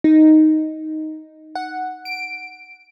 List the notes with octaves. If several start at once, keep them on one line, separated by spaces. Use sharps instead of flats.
D#4
F#5
D7